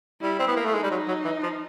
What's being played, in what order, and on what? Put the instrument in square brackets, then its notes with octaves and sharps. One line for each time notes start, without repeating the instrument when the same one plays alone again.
[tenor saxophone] G3 [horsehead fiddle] E4
[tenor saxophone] C4
B3
A#3
A3
[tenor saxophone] G#3 [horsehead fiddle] D#4
[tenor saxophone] G3
F#3
F#3
E3
F3